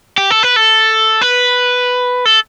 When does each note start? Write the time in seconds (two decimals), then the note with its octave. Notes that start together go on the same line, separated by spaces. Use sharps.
0.18 G4
0.30 A4
0.43 B4
0.56 A4
1.21 B4
2.25 A4